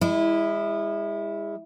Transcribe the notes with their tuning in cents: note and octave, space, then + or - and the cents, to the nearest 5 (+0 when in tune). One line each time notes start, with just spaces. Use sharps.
G#3 -35 E4 -5